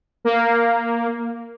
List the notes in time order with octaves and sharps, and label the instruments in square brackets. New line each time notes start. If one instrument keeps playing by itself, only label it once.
[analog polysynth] A#3